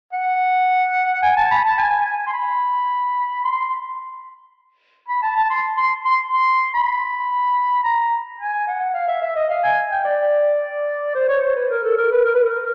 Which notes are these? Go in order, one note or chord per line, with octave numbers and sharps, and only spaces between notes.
F#5
G#5
A5
B5
A5
G#5
G#5
C6
B5
C6
B5
A5
A5
C6
C6
C6
C6
B5
A#5
G#5
F#5
F5
E5
E5
D#5
F5
G#5
G5
D5
C5
C#5
C5
B4
A#4
A4
A#4
B4
A#4
B4
A#4